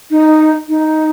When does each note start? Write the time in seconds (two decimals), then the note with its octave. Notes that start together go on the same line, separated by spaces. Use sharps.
0.11 D#4
0.69 D#4